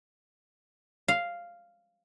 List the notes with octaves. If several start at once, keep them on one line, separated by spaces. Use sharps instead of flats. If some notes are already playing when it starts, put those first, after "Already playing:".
F5